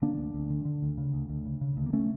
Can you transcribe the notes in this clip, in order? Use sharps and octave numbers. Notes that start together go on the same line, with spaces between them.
D3 A#3 D4
D2
D2
D3
D3
D2
C#3
D2
D2
C#3
C#3
D2
A#3
C#3 A3 C#4